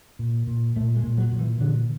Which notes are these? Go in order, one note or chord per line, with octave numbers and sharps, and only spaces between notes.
A#2
A#2
A#2 A3
G#3
A#2
F#3
A#2
E3
A#2 D3